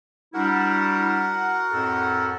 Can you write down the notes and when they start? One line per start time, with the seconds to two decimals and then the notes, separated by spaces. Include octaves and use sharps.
0.34 G3 D4 E4 F#4 A#4 F#5
1.71 F2 A2 A4